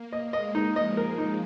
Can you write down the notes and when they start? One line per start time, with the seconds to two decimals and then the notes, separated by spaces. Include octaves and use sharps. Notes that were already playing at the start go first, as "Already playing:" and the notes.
Already playing: A#3
0.13 D#5
0.33 G#3 D#5
0.55 D#4
0.76 F3 D#5
0.97 A#4
1.18 D#4